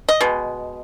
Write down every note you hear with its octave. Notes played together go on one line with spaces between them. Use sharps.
D#5
B2 G#3